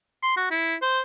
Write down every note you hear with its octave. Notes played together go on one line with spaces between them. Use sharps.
C6
F#4
E4
C5